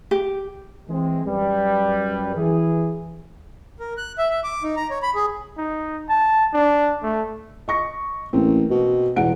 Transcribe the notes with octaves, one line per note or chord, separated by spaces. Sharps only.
G4
E3 G#3 C4
F#2 G3 B4
E3 G#4
A#4
F#6
E5
E5
D6
D#4
A#5
C#5
B5
G#4
D#4
A5
D4
A3
D#5 C#6 A#6
A1 A#3 C4
B2
E1 E2 F#5 D7